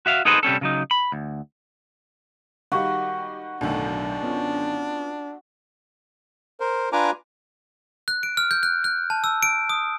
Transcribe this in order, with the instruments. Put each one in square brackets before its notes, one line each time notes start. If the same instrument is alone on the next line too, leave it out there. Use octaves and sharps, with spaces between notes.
[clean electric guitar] F#4 E5 F5
D#4 G#4 A4 B4 C5 D#5
C3 G3 C#4 A4
C#3 F#3 D#4
B5
D2
[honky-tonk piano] D#3 G3 D#4 [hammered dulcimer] F#4 [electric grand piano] G4 F#5
[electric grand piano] B1 A2 A3 [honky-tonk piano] F#2 D3 D#3 [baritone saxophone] D4
[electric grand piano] B3 C#4 F4
[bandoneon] A#4 C5
D4 F4 B4 G#5 A#5 D6
[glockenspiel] F#6
D7
F6
G6
F#6
F#6
A5
E6
D7
D#6